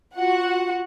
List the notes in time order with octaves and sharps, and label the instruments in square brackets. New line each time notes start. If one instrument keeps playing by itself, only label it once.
[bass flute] F4 [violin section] F#4 F#5